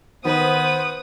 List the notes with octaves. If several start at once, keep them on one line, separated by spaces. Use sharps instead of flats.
D#3 B3 B4 C5 D#6